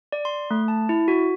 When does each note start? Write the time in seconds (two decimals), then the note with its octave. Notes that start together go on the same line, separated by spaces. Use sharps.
0.12 D5
0.25 C6
0.51 A3
0.68 A5
0.89 E4
1.08 F#4